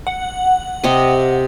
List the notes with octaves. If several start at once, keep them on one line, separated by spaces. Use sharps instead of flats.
F#5
C3 G4 D#5